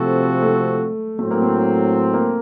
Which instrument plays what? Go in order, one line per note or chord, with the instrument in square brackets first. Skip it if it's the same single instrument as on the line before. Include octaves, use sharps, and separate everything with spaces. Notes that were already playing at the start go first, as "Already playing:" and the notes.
Already playing: [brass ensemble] C3 F3 C4 F#4 A4 [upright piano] A3
[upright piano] A3
[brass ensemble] A2 F#3 C4 [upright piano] A3
[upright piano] A#3
A3
A#3